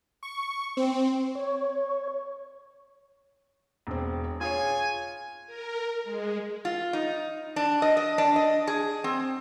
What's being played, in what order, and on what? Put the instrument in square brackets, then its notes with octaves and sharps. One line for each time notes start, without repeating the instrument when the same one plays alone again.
[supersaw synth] C#6
C4
[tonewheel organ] C#5
[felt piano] E1 C4
[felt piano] F4 G#4 C#5 [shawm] G#5
[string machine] A#4
G#3
[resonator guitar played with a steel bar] F4
D#4
D4
D#5
D#5
D4
D#5
G#4
C4